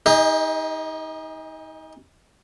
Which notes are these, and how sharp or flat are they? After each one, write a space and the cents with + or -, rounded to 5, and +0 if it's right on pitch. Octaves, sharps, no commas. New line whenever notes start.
D#4 +30 G#4 -35 D#5 -5